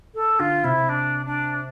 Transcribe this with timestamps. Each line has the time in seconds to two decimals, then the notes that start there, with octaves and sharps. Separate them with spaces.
0.14 A4
0.39 D3 F4
0.64 C3 E4
0.89 D4
1.25 D4